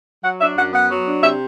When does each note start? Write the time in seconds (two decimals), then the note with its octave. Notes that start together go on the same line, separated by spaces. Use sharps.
0.24 F#3 F#5
0.41 D4 E5
0.57 F#2 F#5
0.73 B3 F#5
0.90 F#3
1.07 D4
1.22 C3 E5